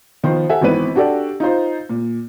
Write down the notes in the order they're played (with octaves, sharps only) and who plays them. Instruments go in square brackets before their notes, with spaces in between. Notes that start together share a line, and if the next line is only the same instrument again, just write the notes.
[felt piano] D#3 F3 B3 C5
A4 E5 F#5 G#5
G#1 E3 B3 C4 B4 D#7
D4 F#4 G4 A4 D5
D#4 F4 C5
A#2